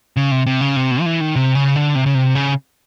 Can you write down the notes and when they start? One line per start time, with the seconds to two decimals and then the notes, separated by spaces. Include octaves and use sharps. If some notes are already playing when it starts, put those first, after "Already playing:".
0.17 C#3
0.31 C3
0.47 C3
0.61 C#3
0.76 C3
0.91 B2
1.01 F3
1.06 E3
1.21 D#3
1.36 C3
1.55 C#3
1.76 D3
1.95 C3
2.06 C#3
2.15 C3
2.35 C#3